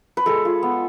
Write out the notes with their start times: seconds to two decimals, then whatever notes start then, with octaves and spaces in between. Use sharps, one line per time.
0.17 B4
0.26 G#3 A4
0.45 F4
0.63 B3